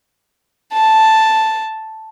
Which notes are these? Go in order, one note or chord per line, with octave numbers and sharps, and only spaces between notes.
A5